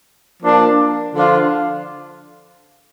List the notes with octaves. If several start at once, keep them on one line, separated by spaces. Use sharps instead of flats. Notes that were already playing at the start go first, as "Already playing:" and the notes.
F3 A#3 D4
D3 F3 D4 F4